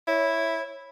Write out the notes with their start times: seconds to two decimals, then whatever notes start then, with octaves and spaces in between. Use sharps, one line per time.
0.08 E4 C#5